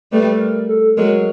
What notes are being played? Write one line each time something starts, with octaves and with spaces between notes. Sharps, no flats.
G3 A3 B4
A4
A#4
A4
F#3 G#3 A#4